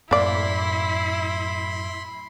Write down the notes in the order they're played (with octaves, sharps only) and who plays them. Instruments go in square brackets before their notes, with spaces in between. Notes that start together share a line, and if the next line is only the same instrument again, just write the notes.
[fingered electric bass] F#2 A2 [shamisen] A#3 D5 [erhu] E4 [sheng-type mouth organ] B5 C6